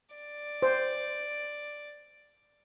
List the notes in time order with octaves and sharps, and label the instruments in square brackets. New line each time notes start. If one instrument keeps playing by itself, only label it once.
[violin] D5
[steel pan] C5